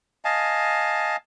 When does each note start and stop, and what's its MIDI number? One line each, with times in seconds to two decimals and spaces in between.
0.25 1.17 75
0.25 1.17 77
0.25 1.17 80
0.25 1.17 81